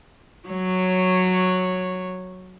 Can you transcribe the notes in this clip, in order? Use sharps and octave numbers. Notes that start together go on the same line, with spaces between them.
F#3 C#5